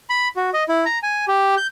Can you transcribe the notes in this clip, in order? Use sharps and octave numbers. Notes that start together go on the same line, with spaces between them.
B5
F#4
D#5
E4
A#5
G#5
G4
G6